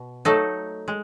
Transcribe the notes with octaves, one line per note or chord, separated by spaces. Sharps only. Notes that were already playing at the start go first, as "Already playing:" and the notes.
Already playing: B2
F#3 A3 D#4 A4
G#3